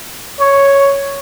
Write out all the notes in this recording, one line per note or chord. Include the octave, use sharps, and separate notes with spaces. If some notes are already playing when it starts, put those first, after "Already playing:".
C#5